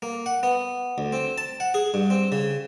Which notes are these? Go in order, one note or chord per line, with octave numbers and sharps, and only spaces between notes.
A#3
F#5
B3
D2
C4
A5
F#5
G#4
G2
C4
C#3